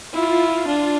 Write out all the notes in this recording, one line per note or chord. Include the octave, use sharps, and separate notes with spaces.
E4 F4
D4